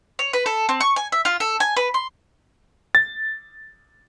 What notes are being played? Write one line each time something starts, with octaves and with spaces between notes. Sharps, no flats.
C#5
B4
A4
C4
C#6
G#5
E5
F4
A4
G#5
B4
C6
A6